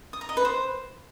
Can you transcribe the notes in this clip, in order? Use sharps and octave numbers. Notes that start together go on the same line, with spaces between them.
D#6
A#5
D#5
B4
C5